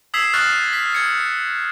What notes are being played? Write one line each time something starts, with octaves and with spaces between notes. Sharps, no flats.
D#6 E6 G#6 B6 C7 E7
C#6 D#6 F6 F#6 A6 C7
B6
G#6 C#7